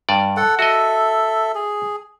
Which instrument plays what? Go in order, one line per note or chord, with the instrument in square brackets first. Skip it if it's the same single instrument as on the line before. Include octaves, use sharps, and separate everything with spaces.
[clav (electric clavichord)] G2 D5
[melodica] A4 F#5
[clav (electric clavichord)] F#4 D#5 [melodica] A4 E5
[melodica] G#4